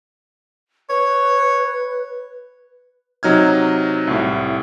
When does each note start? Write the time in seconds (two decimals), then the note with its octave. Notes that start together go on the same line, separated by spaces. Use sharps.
0.90 B4 C#5
3.23 C3 F#3 D#4 F6 G#6
4.07 C2 A2